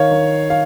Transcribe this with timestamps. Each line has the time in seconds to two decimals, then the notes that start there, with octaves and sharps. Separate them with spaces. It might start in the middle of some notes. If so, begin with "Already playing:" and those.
Already playing: D#3 C#5 F5
0.11 D#3
0.50 F5